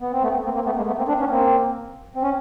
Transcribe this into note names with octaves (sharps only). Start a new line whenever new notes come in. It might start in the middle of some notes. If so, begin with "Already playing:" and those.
B3
C4
A3 B3
A#3 C4
A#3 C4
A3 B3
G#3 A#3
A3 B3
A#3 C4
C4 D4
B3 C#4
A#3 C4
C4
C#4